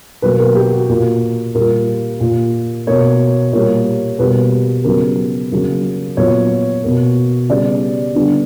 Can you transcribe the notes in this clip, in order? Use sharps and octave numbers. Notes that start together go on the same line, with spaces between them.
B2 F#3 A#3 B4
A#4
G4
F#4
A#2 A#3
A#2 G3 A#3 A#4
A#2 A#3
B2 A#3 C#5
A#2 G3 A#3 C#5
B2 G3 A#3 B4
C#3 F#3 B3 A#4
C#3 F#3 A#3
A#2 F#3 B3 C#5
B2 A#3
C#3 G3 B3 D5
D3 G3 B3